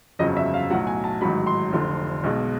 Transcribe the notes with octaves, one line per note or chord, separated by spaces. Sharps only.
G1 F2 C#3 F#3 D#5
E5
F5
B1 A2 F#3 F#5
G#5
A5
A1 G#2 D#3 F#3 B5
C6
F1 F2 D3
B1 B2 G#3